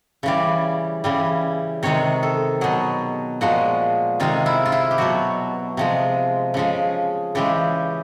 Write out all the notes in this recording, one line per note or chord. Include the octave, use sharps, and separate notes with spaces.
C#3 E3 G3 D5
C#3 E3 G3
C3 D#3 G#3 C#5
A4
B2 F#3 G#4
A#2 F3 G#3 F#4
C3 D#3 G#3 F4
E4
F4
E4
G4
B2 F#3 F#4
C3 F3 G#3
C#3 F3 G#3
C#3 E3 G#3 G4